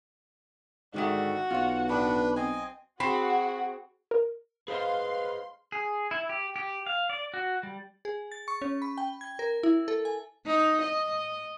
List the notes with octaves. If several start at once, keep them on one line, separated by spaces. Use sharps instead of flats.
G#2 D3 D#3 A3 F#4
B1 F4 C#5
A2 D4 B4
C4 D#5 G#5
C4 F#4 G#4 B5
A#4
G#4 B4 C5 D#5 F5 C6
G#4
E4
G4
G4
F5
D5
F#4
G3
G#4
A6
C#6
C#4
B5
G5
G#6
A#4
E4
A4
G#5
D#4
D#5